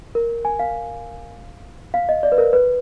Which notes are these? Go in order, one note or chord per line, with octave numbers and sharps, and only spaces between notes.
A#4
G#5
F5
F5
D#5
D5
B4
A#4
B4